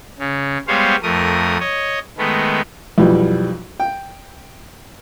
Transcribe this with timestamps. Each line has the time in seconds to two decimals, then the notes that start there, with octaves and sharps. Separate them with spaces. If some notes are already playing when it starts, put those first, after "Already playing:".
0.19 C#3
0.67 G3 G#3 B3 C5 C#5 F5
1.03 F2 A3 A#4 D#6
1.60 C#5 D#5
2.18 D#3 G#3 A3 B3
2.98 B1 F2 E3 G3
3.80 G5